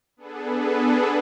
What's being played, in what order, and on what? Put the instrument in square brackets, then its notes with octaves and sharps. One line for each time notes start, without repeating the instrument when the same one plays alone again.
[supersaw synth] B3 D4 G#4 A4 B4